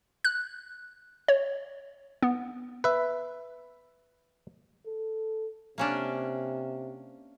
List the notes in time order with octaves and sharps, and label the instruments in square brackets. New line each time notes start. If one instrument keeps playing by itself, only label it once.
[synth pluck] F#6
C#5
B3
[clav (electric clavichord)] B4 E5
[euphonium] A4
[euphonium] C3 [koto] A#3 C#4 D4